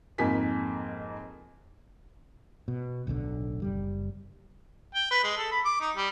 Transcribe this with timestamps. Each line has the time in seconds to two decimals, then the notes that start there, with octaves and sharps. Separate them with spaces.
0.18 F2 G#2 A#3 G#5 B6
2.68 B2
3.07 D1 B1 A#2 D3
3.62 F#1 G3
4.95 G5
5.11 B4
5.24 G#3
5.37 A4
5.52 B5
5.65 D6
5.81 D#4
5.97 G3